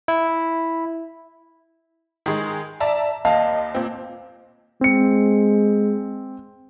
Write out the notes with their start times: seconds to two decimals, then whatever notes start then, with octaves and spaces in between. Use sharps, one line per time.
0.08 E4
2.26 D#3 G#3
2.80 D5 E5 A5 A#5
3.25 D#2 D#5 F5 A5
3.75 A#2 C4
4.81 G#3 C4 C#7